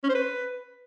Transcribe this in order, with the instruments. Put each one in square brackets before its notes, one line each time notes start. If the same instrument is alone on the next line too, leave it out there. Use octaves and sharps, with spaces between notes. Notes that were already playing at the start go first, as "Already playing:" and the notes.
[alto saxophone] C#4
C5
B4